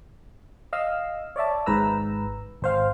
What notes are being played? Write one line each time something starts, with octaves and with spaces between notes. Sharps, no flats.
D#5 F5 E6
C#5 D5 E5 A5
G#1 G#2 B4 A#5 E6
G#1 C5 F5